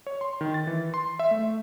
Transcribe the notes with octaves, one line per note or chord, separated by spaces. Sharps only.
C#5
C6
D#3
A6
E3
C6
E5
A3